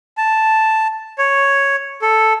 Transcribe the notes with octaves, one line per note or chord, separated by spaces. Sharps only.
A5
C#5
A4